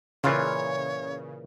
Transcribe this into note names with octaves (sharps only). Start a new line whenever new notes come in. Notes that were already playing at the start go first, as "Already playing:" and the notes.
A#2 C#3 E3 F4 C#5